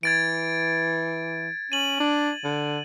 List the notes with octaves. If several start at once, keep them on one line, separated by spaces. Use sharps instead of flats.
E3 G#6 A6 D7
C#4 D#7 F#7
D4
D3